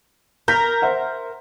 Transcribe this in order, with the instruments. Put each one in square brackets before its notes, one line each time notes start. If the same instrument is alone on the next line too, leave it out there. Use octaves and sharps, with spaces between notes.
[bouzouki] A#4 [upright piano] G6 B6
[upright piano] C5 E5 F#5